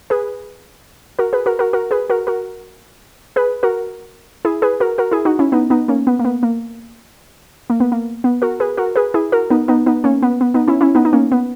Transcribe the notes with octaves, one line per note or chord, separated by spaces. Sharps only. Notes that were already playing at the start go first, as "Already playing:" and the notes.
G#4 B4
F#4 A#4
G#4 B4
F#4 A#4
F#4 A#4
F#4 A#4
G#4 B4
F#4 A#4
F#4 A#4
G#4 B4
F#4 A#4
E4 G#4
G#4 B4
F#4 A#4
F#4 A#4
E4 G#4
D#4 F#4
C#4 E4
B3 D#4
B3 D#4
A#3 C#4
B3
A#3
B3
A#3
A#3
B3
A#3
B3
F#4 A#4
G#4 B4
F#4 A#4
G#4 B4
E4 G#4
F#4 A#4
B3 D#4
B3 D#4
B3 D#4
A#3 C#4
B3
B3
B3 D#4
C#4 E4
C#4 E4
B3 D#4
D#4
A#3 C#4
B3